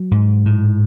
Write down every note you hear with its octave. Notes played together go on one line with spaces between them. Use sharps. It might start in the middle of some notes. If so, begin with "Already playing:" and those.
Already playing: F#3
G#2
A2